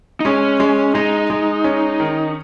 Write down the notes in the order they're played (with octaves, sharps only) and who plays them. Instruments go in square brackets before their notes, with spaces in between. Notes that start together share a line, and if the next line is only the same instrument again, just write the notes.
[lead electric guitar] D#4
[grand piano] G#3 [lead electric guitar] C#4
[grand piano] G#3
[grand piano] G#3 [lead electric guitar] D#4
[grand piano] G#3
C#4
D#3